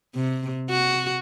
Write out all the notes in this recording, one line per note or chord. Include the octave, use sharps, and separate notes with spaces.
C3
F#4